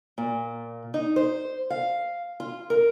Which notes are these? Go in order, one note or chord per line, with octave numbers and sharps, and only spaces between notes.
A#2
D#4
C5
F5
F4
A#4